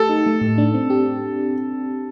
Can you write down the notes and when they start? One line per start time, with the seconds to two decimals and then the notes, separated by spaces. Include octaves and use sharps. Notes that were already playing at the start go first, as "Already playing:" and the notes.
Already playing: A3 G4 A4
0.09 D#4
0.26 A3
0.41 A2
0.58 D4
0.75 C4
0.90 G4